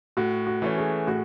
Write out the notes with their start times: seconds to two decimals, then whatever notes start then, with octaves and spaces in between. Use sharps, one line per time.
0.17 A2 F#4
0.47 F#4
0.62 E3 A3 C#4
0.78 G#4
1.07 A2 F#4